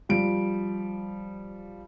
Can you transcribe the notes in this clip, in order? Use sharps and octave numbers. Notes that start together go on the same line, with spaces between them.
F3 G3 D7